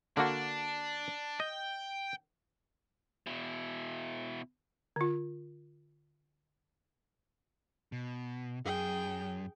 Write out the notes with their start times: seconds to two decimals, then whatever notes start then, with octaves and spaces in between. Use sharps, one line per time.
0.17 D3 A#3 D4 F#4
1.40 D#5 G5
3.27 B2 E4
4.96 D3 F4
7.92 B2
8.66 F#2 G#4 G5